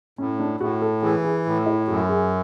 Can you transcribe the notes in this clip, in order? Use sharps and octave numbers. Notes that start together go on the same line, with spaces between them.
A2 C#4
D4
A2 F#4
A4
E3 G#4
G#4
A2
E4
F#2 F#4
G#4